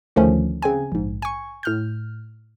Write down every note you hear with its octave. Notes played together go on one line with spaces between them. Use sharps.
D2 D3 D#3 F3 A3 C#4
C#3 C4 G#5
A#1 G#2
G#5 C#6
A2 F6 G6